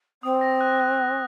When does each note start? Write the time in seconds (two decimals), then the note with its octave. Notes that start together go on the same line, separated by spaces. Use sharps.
0.23 C4 D#6
0.41 A#6
0.61 F#6
0.80 F#6
0.98 F#6